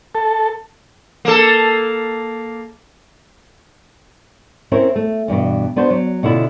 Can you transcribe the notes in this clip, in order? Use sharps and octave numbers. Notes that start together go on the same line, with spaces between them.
A4
A#3 A4
C4 C#4 E4 A#4 C5 C#5
A3
E2 G2 B2
B3 D4 F#4 C5
F#3
B2 D3 C#4 E4 F4